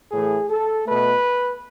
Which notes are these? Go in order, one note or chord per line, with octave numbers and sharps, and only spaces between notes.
A2 E3 A3 G#4
A4
B2 A3 B4